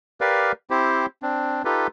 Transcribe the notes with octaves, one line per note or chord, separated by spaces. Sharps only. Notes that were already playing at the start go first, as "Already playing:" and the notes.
G4 A#4 B4 D5 F5
C4 E4 G4 C5
C4 D4
D#4 F4 G4 A4 B4